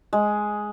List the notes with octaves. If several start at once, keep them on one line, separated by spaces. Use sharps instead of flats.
G#3